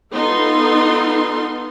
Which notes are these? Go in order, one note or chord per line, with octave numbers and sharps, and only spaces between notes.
B3 D#4 F4 A4 C6